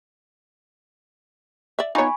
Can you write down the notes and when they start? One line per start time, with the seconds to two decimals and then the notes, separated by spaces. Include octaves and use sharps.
1.79 D5 E5
1.95 B3 D#4 F4 C#5 G#5 B5 C#6